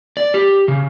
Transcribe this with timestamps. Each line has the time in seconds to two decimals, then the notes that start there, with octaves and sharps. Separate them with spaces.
0.17 D5
0.34 G4
0.68 C#3